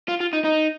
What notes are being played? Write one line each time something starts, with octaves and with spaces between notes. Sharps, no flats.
F4
F4
D#4
D#4